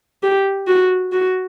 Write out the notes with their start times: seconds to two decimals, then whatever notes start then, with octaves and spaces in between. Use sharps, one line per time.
0.23 G4
0.67 F#4
1.12 F#4